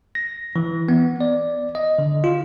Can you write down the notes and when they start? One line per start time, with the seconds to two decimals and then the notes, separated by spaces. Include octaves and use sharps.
0.15 A#6
0.56 E3
0.89 B3
1.21 D5
1.75 D#5
1.99 D3
2.24 F4